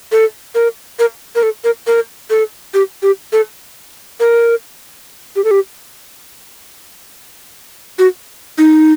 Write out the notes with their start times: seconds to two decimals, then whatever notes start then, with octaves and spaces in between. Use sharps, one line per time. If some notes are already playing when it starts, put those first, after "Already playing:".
0.12 A4
0.55 A#4
0.99 A#4
1.35 A#4
1.43 A4
1.64 A#4
1.87 A#4
2.30 A4
2.74 G4
3.02 G4
3.32 A4
4.20 A#4
5.36 G4
5.44 A4
5.51 G4
7.99 F#4
8.58 D#4